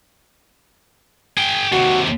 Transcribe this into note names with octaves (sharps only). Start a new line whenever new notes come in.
G#4 G5
D#2 C3 F#4